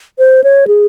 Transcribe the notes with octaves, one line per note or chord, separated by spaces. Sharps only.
C5
C#5
G#4